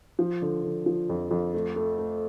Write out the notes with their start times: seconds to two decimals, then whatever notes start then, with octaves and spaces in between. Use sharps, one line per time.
0.19 F3
0.42 D3
0.64 D3
0.86 F3
1.10 F2
1.31 F2
1.54 A3
1.76 A3
1.98 A3